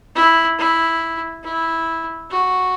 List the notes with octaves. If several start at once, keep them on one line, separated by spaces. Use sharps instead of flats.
E4
E4
E4
F#4